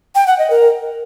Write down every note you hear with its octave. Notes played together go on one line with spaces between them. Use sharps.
G5
F#5
D#5
A#4